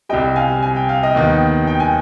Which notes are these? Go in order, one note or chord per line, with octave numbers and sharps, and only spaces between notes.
C2 C3 G3 D#5 G5
F5 G#5
G#5
G5
F5
D#5 G5
D#2 D#3 B3
G5
G#5